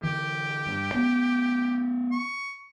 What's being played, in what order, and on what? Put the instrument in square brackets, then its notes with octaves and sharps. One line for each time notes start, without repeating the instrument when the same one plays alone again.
[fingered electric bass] D3 E3 [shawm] G4
[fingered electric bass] G2
B3 C#4
[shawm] C#6